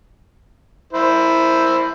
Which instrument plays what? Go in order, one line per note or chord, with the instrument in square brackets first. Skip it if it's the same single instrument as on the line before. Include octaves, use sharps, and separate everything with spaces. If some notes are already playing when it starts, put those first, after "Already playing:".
[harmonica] E4 C5